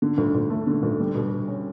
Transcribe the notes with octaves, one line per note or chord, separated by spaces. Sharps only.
D3
D2
D2
A3
D3
D2
G3
B2
B2
C#4